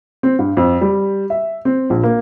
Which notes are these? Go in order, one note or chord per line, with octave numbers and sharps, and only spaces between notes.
C4
G2
F2
G3
E5
C4
A#1
A#3